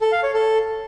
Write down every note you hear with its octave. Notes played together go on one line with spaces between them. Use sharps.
A4
F5
C#5
A4